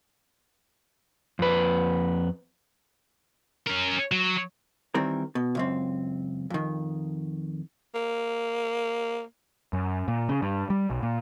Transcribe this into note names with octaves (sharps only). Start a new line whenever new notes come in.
F2 B4
C#4 A#4
F#3
D#3 E3 G3 C4 A#4
B2
C#2 F#2 C4
F2 D#3
A#3
F#2
A#2
C#3
G2
G3
B1
A#2